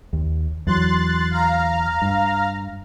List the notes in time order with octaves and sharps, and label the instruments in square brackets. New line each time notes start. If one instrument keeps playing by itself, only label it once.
[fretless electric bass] D#2
[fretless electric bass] E2 F#3 [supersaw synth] C6 F#6 A6
[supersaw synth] F5 A#5
[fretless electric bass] G2